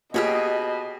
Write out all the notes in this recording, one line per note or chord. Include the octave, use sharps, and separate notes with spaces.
B2 A#3 F4 G4 G#4 C#5 D#5 E6